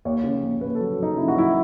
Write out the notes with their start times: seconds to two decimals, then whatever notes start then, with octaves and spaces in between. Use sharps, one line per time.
0.05 D#2 C#5
0.24 C#3
0.42 D#2
0.61 D#2 B4
0.75 F#3 A4
0.99 F#3 D#4
1.17 C#3 E4
1.28 F#4
1.36 F#3 E4